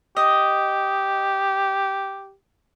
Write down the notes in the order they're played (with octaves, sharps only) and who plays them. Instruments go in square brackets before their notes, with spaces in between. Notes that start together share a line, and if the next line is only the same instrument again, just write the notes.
[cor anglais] G4 [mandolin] D#5